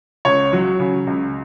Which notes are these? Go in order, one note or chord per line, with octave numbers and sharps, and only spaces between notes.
C#2 C#5
F#3
C#3
C#2